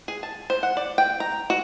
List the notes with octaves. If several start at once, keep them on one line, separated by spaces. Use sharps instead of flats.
G#4
A5
C5
F#5
D5
G5
A#5
F#4